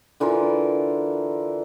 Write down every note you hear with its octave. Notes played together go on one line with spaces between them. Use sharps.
D3 E3 F4 A#4